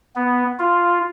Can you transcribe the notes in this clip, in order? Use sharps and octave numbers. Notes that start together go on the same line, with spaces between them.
B3
F4